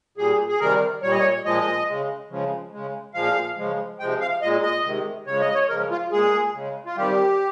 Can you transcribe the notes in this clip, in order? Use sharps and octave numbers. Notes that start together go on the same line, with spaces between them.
A#2 G3 G#4
G#4
C3 D#3 G3 A#4
A#2 G3 C#5
D#5
C#5
A#2 F3 G#3 D#5
C#3 G#3
C#3 F3 G#3
C#3 G#3
A#2 F3 G#3 F5
C#3 F3 G#3
C3 F3 G#3 G5
F5
A#2 G#3 D#5
D#5
C3 D#3 G#3
C#3 F3 G#3 C#5
D#5
C#5
C#3 F3 G#3 A#4
F4
A#2 G#3 G#4
C#3 G#3
F4
C3 D#3 G3 G4